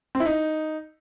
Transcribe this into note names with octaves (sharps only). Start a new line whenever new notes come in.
C4
E4
D#4